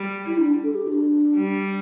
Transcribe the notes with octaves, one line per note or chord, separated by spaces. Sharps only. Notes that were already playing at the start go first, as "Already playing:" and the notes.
Already playing: G3
E4
D4
A4
G4
D4
G3